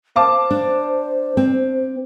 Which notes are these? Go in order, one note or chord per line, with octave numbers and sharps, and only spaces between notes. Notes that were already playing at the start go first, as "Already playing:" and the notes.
C5 F5 A5 D6
D4
C4